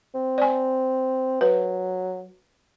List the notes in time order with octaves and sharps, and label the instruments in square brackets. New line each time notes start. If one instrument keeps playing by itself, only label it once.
[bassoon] C4
[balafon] D5 G#5
[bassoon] F#3 [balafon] B4